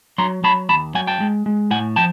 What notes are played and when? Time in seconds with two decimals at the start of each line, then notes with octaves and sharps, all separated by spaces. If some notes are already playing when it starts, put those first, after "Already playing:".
0.18 F#3 A#5 C6
0.43 F#3 A5 B5
0.69 D#2 A5 B5
0.95 F#3 F#5 G#5
1.07 G5 A5
1.20 G#3
1.46 G#3
1.71 A2 F#5 G#5
1.96 F3 G5 A5